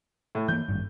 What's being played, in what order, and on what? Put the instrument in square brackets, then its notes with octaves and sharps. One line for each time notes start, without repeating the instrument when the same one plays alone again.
[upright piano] A2
[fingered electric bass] E3 F3 A#3 [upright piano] G6
[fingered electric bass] G#1 G2